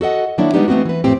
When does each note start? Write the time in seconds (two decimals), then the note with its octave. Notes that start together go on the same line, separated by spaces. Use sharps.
0.01 F#4 A4 D#5 F#5
0.38 D#3 F#3 A#3 D4 E4
0.53 G3 G#3 B3 D4 D#4 G4
0.68 E3 A3 B3 C4 F#4
0.85 E3 B4
1.04 F2 A2 C4 G4